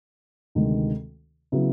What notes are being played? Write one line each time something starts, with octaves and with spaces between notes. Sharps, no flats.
D2 C3 D#3 G#3
C#3 F#3 B3 E4